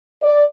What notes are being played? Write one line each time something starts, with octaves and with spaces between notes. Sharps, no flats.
D5